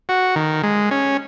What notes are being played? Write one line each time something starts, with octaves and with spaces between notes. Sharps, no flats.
F#4
D#3
G#3
C#4